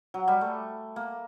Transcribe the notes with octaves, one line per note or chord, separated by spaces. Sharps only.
F#3
G3
A3
A#3